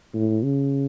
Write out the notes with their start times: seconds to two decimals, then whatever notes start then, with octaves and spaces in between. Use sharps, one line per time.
0.14 A2
0.44 C#3